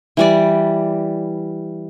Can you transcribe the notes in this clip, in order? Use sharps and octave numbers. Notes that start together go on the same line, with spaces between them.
E3 G3 D5